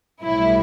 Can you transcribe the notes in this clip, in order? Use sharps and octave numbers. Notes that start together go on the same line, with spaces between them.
B1 A2 G3 E4